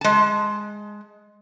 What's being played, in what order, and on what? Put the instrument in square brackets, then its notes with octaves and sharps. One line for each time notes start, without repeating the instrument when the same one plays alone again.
[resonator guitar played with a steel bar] G#3 A5